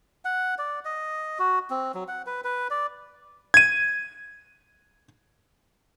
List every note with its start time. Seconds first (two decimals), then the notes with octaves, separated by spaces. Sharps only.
0.25 F#5
0.58 D5
0.85 D#5
1.39 F#4
1.70 C4
1.94 F#3
2.08 F#5
2.26 B4
2.44 B4
2.70 D5
3.54 G#6 D#7